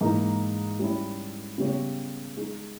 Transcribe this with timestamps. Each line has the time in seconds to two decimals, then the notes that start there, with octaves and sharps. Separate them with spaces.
0.01 G#2 E3 A#3 D#4
0.79 G3 C#4 E4
1.58 C#3 G3 B3 G4 C#5
2.37 G#3 D#4 G#4